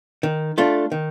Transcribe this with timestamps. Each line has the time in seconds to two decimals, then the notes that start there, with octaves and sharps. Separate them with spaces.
0.23 D#3
0.58 A3 D4 F4
0.92 D#3